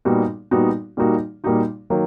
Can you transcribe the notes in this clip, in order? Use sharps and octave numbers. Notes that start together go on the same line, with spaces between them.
A#2 G3 B3 D#4 F#4
A#2 G3 B3 D#4 F#4
A#2 G3 A#3 D#4 F#4
A#2 G3 A#3 D#4 F#4
D#3 F#3 A#3